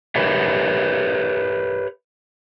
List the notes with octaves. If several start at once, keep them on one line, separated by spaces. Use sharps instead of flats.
G4 A#4 B4 C#5 E5